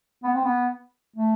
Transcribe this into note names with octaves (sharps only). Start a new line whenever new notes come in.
B3
C4
B3
A3